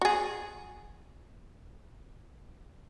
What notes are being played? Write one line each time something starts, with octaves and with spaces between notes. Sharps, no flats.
F#4 G#4